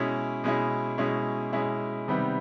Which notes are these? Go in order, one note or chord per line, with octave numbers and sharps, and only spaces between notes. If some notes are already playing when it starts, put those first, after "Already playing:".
Already playing: B2 G#3 C#4 E4
B2 G#3 C#4 E4
B2 G#3 C#4 E4
B2 G#3 C#4 E4
C3 D#3 G3 B3